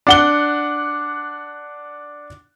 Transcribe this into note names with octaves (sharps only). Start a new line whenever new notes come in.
D4 F#5 G7